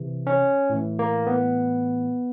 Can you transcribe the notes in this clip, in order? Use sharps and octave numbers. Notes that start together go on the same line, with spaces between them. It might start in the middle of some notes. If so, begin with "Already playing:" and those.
Already playing: C3 E3
C#4
A2 E3
A#3
B3